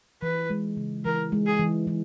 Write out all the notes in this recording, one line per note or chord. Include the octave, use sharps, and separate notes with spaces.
E3 B4
G#3
C#3
E3 A#4
G#3
G#4
E3
E3